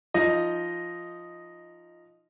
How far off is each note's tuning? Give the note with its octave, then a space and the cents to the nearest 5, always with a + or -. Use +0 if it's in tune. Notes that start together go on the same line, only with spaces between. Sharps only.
F3 -5 D#4 +10 D#5 +0